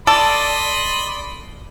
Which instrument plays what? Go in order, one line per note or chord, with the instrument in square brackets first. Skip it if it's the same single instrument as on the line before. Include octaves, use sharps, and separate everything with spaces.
[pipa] A4 [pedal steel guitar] D5 [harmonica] D#5 B5 C6